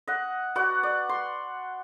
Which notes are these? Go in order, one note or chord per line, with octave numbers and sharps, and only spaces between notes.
D#5 F#5
F#4 B4 D5 F#5
D5
C6